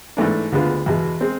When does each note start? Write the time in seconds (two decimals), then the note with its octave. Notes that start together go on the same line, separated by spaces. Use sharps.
0.17 G#2 E3 A3 D4
0.52 D2 D3 G#3 B3 F4
0.86 E2 B2 G#3
1.21 G#3 C4